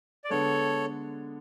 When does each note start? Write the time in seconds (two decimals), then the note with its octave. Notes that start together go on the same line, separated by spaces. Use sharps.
0.24 D5
0.30 D3 G#3 B3 A4 C#5